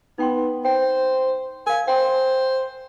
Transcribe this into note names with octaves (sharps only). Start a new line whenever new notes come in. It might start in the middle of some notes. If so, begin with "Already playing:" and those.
B3 D#4 G5 C6
C5 G5
A#4 F5 G#5
C5 G5 C6